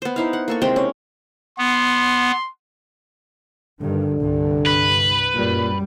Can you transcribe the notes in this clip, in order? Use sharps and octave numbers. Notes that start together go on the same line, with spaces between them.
B3 C5
D#4 E4 F5
F#5
A#3 A4 C#6
C3 G#3 C4 G5
C#4
B3 C6
G2 D3 D#3
C2 G2
B4
F#2 A#2 G3